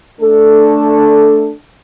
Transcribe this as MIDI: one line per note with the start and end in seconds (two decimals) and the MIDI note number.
0.21 1.53 57
0.21 1.53 62
0.21 1.53 69